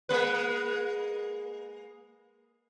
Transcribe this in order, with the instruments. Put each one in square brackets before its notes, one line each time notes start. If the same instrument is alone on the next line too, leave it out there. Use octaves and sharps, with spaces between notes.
[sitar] G#3 A#3 B4